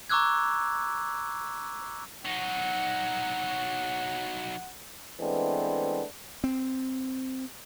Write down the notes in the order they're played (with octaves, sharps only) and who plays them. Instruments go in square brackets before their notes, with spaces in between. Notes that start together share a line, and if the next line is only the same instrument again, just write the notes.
[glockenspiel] A#5 C#6 D6 E6 F#6 G#6
[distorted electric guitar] F#3 D#4 [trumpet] F#5
[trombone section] E3 G#3 A3 B3 C4 D4
[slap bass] C4